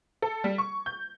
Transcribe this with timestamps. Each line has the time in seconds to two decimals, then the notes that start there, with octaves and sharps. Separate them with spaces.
0.22 A4
0.44 G3
0.58 C#6
0.86 G6